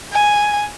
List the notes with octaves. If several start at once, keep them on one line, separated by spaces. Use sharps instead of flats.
G#5